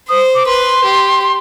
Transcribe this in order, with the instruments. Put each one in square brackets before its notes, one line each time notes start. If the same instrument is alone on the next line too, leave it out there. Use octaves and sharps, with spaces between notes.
[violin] C5 [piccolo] D#6
[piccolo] D6
[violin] B4 [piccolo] C6
[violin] G4